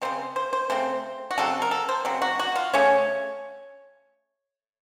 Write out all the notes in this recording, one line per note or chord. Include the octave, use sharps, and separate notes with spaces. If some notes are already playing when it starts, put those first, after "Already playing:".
C#3 A3 C4 C5
C5
C5
C#3 A3 C4 C5
F#4
C#3 F#3 C4 A4
A#4
A4
C5
C#3 F#3 C4
F#4
F#4
F4
C#3 A3 C#4 C#5